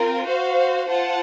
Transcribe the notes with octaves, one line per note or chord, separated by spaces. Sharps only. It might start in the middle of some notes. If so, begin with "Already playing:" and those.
Already playing: C4 F4 A#4
F#4 C5 F5
F4 C5 F#5 A5